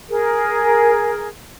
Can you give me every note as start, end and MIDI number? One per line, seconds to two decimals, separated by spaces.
0.10 1.27 68
0.10 1.27 70